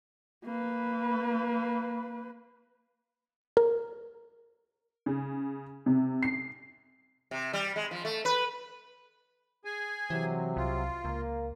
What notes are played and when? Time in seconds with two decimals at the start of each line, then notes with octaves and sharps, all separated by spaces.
0.45 A#3 B4
3.57 A#4
5.06 C#3
5.86 C3
6.23 C7
7.31 C3
7.53 G3
7.76 G#3
7.91 F3
8.05 A3
8.25 B4
9.65 G#4 G#5
10.10 C3 E3 F#3
10.57 C2 F4
11.05 C#2 A#3